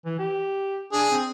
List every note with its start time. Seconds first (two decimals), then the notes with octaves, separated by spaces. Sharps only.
0.05 E3
0.19 G4
0.93 D4 G#4
1.11 C4